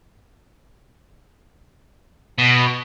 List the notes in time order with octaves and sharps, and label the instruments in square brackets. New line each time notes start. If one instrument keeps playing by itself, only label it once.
[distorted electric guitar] B2